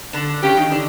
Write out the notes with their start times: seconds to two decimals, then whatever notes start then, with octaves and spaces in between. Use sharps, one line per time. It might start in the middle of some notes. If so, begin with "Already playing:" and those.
0.13 D3 D4
0.43 C#3 C#4 G4
0.57 D#3 D#4
0.72 D3 D4